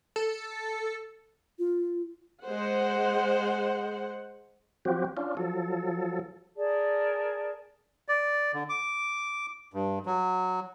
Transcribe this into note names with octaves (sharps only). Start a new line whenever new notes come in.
A4
F4
G#3 C5 F#5
F3 F#3 C4 F#4 G4
C#4 D4 F4
F3 F#3 A4
G#4 A#4 D5 A5
D5
D3
D6
G2
F#3